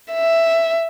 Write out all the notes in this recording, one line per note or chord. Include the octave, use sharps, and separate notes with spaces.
E5